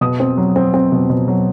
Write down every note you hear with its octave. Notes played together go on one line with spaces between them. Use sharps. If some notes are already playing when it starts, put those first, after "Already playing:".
B2 D#6
C4
F#3
C4
C4
B2
B2
F#3